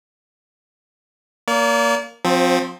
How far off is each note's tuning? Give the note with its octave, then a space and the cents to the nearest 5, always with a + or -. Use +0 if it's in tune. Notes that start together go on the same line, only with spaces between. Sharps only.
A#3 +0 D5 -40
F3 +30 C4 +0